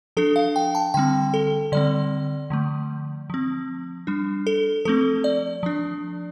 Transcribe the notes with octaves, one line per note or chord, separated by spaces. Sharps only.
F3 D4 A4
F5
G5
A5
D3 G3 C4 G5
A4
D3 G3 C4 D5
D3 F3 A3
F3 C4
G3 D4
A4
F3 A3 C4 A4
D5
F3 D4